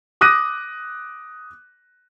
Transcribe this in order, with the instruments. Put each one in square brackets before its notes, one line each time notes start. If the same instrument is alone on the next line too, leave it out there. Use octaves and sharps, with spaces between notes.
[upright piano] D6 D#6 F#6 A#6 D#7